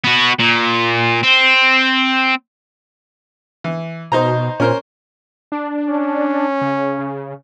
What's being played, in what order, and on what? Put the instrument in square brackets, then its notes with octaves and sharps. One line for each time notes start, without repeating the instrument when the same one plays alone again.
[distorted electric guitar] B3 F#4
A#2
C4
[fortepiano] E3
[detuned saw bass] B2 [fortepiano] D#4 C5 A#5
[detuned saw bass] A#2 [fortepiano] C#4 A#4 C5
[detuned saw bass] D4
[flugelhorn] C#4
[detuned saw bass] C#3
C#3